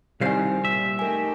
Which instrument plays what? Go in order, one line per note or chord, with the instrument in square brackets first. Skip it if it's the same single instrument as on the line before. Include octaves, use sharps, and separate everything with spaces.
[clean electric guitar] C2 [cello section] D#3 C4 [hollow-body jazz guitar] G3 C5 F5 [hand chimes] G4 G#5
[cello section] A#2 [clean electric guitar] E5
[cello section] A3 D#4 G4 [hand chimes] A#4 G#5